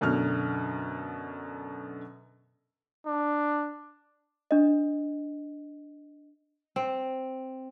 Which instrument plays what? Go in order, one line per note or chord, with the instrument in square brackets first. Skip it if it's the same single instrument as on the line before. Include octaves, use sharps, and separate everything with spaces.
[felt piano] F#2 B2 D3 F6
[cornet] D4
[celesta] D4 D#5
[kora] C4